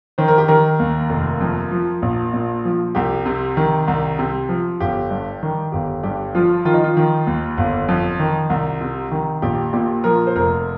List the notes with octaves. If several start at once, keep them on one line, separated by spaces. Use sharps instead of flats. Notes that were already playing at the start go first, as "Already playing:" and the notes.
D#3 C5
A#4
G4
D#3 A#4
D#2
F1
F2
F3
A#1
A#2
F3
C2 G4
C3
D#3
C2
C3
F3
G1 G4
G2
D#3
G1 G4
G2 G4
F3 F4
D#3 F4
D#4
F4
D#3
D#2
G1
F2
D#3
C2
C3
D#3
A#1 G4
A#2 G4
F3 A#4
C5
F1 A#4